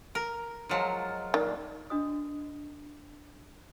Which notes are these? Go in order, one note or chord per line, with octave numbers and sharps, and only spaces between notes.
A#4
F3 F#3 G#3 F4 A#4
A#2 D#3 D4
D4 F#4 D#5 D#6